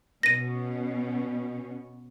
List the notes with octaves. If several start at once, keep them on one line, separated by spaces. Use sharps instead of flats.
B2 C#4 A#6 D#7